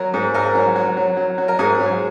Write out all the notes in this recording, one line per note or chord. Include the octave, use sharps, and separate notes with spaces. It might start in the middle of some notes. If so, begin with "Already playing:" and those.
Already playing: F#3 A#4
G#2
G#2 A#4
F#3
F#3
F#3
F#3
F#3
A#4
G#2 G#4
F#3